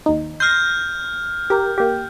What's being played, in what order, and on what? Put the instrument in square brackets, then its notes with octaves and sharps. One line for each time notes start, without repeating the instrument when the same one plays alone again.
[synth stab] D#2 D#4
[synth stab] C6 A#6 [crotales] F6 G6
[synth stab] G4 A#4
A#3 G4